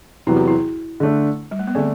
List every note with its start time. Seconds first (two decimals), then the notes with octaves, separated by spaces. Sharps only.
0.27 E2 C3 F#3 B3 E4
0.36 F#4
0.48 E4
1.00 D3 A3 D4
1.51 G3
1.59 A3
1.67 B3
1.75 D3 A3 C4 D4